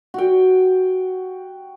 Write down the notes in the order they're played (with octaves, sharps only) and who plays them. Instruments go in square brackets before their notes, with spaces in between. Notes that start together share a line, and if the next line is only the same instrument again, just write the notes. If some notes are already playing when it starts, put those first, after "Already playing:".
[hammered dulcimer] F#4 G5